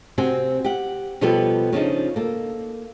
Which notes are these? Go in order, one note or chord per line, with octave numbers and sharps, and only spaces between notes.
C3 C4 F#4 G#5
G4 F#5
B2 F3 G3 B3 G4 A4
C#3 F3 D4 D#4
A#3 A4